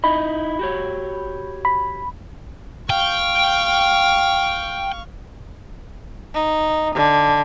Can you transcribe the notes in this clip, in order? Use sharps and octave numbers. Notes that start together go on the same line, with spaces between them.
D#4 E4 D#5 B5
F#4 G4 C#5
B5
F5 G5 C#6
D#4
D3